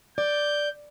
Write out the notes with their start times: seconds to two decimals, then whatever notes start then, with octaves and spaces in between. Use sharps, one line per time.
0.18 D5 G6